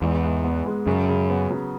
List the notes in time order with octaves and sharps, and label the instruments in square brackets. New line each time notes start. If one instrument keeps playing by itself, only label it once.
[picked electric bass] E2 [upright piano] G#2
[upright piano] G#2
B3
G#3
[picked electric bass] F#2 [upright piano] C#3
[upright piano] C#3
B3
F#3